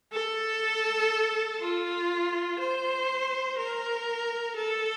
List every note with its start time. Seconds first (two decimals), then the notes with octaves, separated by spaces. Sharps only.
0.12 A4
1.60 F4
2.59 C5
3.57 A#4
4.56 A4